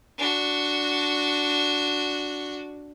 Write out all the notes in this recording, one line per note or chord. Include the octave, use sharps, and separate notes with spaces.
D4 F#4